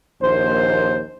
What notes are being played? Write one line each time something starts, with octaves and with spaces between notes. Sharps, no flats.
A#1 D#2 C5